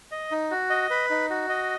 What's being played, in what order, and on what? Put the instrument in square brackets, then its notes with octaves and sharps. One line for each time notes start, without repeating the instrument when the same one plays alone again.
[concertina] D#5
D#4
F#4
D#5
B4
D#4
F#4
D#5